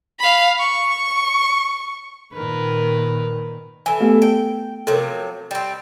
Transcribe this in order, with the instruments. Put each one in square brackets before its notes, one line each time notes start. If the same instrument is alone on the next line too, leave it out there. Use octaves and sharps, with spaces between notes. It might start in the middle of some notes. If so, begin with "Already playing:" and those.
[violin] F5 B5
C#6
[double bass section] A#2 D#3 [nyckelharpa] A#4 B4
[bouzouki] E3 A4 [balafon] G#5
[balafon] A3 B3 G4
[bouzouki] G5
[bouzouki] C3 F3 F#3 [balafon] A4 A#4
[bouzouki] G3 C4